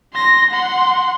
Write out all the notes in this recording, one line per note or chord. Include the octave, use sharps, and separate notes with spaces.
C6 A#6
F#5 C6